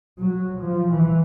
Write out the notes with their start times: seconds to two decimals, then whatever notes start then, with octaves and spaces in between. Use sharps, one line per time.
0.17 F#3
0.62 F3
0.92 E3